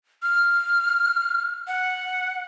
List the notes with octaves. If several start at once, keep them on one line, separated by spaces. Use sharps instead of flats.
F6
F#5